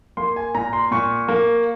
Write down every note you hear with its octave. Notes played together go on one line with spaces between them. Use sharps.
A#3 C6
G#5
A#2 A#5
C6
A#2 C#6
A#3